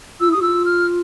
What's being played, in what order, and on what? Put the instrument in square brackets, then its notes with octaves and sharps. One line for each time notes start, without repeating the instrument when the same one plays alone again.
[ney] F4 [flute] E6
[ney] E4
[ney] G4 [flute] D#6
[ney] F4 [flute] E6
[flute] F6